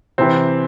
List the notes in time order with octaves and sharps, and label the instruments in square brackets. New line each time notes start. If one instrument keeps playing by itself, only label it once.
[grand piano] C3 E3 C4